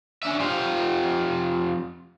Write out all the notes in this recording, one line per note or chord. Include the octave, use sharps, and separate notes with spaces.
C#4 D4 E5
F2 F4 G4 C5 F5